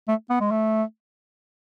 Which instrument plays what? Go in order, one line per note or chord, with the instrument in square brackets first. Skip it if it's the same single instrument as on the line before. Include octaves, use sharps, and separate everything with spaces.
[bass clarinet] A3
B3
G#3
A3